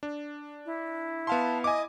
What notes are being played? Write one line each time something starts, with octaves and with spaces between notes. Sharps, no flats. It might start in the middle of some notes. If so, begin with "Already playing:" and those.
D4
E4
B3 F5 A5 C6
D#5 G#5 D6